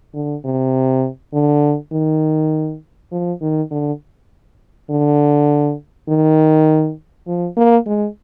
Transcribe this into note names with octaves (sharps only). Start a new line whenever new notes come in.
D3
C3
D3
D#3
F3
D#3
D3
D3
D#3
F3
A#3
G#3